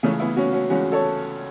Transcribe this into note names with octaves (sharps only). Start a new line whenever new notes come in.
C#2 C#3 E3 A3 C#4
B3 E4
C#4 F#4
C#4 F#4
C#2 C#3 E3 C#4 F#4
A4 C#5